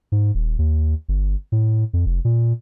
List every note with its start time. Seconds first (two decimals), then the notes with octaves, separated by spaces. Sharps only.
0.12 G#2
0.35 D#1
0.59 D#2
1.09 G1
1.52 A2
1.93 F2
2.06 F1
2.25 A#2